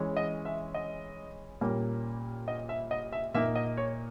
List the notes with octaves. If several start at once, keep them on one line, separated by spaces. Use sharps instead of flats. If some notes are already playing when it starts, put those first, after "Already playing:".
Already playing: E3 G#3 C#4
D#5
E5
D#5
A#2 G3 A#3 C#4
D#5
E5
D#5
E5
A#2 A#3 D#4 E5
D#5
C#5